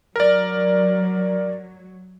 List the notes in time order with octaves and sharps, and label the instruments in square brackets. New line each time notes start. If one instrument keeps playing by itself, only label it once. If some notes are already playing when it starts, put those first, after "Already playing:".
[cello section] F#3 [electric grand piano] A#4 D5